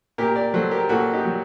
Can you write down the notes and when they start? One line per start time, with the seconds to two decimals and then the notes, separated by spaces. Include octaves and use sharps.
0.18 A#2 G4 A#4
0.36 A#4 D5
0.54 F#3 A4 C5
0.71 G4 A#4
0.89 A#2 F#4 A4
1.13 D#4 G4
1.25 F#3